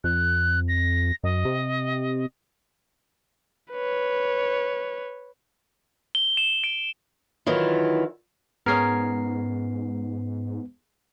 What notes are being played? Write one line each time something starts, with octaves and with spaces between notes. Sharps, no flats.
F2 F#6
A#6
F#2 D#5
C3
B4 C#5
G7
E7
D7
D#3 E3 F#3 E4 F4
G#2 B3 C#4 G#4 A#4 C7